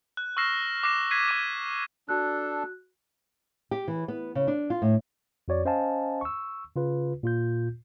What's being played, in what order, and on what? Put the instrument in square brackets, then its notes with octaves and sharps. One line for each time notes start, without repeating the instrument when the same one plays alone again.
[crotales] F#6
C#6 E6 F6 A#6 C7 E7
D6 F6 F#6 A#6 C7 E7
F#6 G#6 B6 C7 D#7
D6 G#6 D#7
[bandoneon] D4 A4 [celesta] F#4 F#6
[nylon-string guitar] G4
E3
B3
C#3
D4
F4
A2
[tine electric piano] F2 F#4 C#5 D5
C#4 C5 D#5 F5 G#5 A5
C#6 E6
C#3 F4 B4
A#2 F4 G6